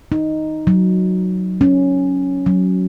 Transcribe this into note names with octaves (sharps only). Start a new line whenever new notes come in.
D#4
F#3
C#4
F#3